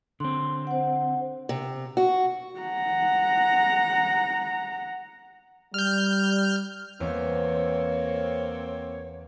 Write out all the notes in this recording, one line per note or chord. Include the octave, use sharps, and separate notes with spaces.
D3 C4 C6
C5 F#5
C3
F#4
F#5 A#5
G3 F6 G6
E2 A#3 C4 C#5